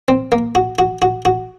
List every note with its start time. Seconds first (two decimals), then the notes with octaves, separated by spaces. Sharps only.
0.08 C4
0.32 A#3
0.55 F#4
0.79 F#4
1.02 F#4
1.25 F#4